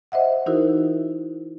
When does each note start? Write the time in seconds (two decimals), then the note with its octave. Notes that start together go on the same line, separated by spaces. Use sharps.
0.12 C5 D#5 E5 F#5
0.46 E3 D#4 E4 F#4 A#4 C5